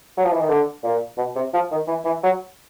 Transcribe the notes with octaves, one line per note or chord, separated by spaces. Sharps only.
F#3
F3
E3
D#3
D3
A#2
B2
C3
F3
D#3
E3
E3
F#3